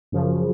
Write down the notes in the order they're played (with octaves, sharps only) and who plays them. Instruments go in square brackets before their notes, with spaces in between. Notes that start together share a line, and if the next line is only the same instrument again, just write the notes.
[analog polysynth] F#2 C#3 F3